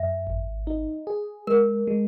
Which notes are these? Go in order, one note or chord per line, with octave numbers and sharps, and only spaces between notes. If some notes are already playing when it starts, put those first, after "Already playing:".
Already playing: F#2 E5
G#1
D#4
G#4
G#3 A#4
G#3